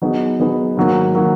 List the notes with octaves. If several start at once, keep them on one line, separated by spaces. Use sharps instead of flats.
F#3 B3 D#4 G#4 B4
F#3 B3 D#4 G#4 B4
G#2 D#3 F#3 A#3
D#3 F#3 A#3